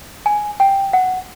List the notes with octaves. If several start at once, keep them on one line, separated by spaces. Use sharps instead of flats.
G#5
G5
F#5